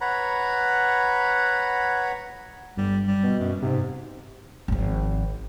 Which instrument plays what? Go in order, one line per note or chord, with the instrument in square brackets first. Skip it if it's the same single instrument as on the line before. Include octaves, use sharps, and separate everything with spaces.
[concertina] B4 C#5 F#5 A#5 B5
[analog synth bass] G1 [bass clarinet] G3
[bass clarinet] G3
[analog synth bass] B2
[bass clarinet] F#2
[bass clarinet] G#2 [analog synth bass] C3
[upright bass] G#1 F3